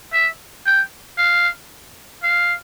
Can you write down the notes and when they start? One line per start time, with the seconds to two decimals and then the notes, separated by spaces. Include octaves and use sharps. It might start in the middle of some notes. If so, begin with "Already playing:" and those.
0.13 E5
0.66 G5
1.18 F5
2.23 F5